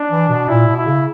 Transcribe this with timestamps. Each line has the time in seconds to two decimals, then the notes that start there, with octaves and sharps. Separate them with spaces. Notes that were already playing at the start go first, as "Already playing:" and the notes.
Already playing: D4
0.11 E3
0.29 B2
0.48 A#2 E4
0.67 B2
0.77 E4
0.86 C#3